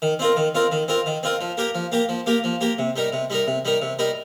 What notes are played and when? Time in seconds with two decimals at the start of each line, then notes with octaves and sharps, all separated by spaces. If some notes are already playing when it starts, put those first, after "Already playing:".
0.02 D#3
0.19 C4 F4 A#4
0.36 D#3
0.55 C4 F4 A#4
0.72 D#3
0.88 C4 F4 A#4
1.06 D#3
1.23 C4 F4 A#4
1.41 F3
1.57 A#3 G4 A#4
1.75 F3
1.92 A#3 G4 A#4
2.09 F3
2.26 A#3 G4 A#4
2.44 F3
2.61 A#3 G4 A#4
2.78 C3
2.96 G3 D#4 A#4
3.13 C3
3.30 G3 D#4 A#4
3.47 C3
3.65 G3 D#4 A#4
3.82 C3
3.99 G3 D#4 A#4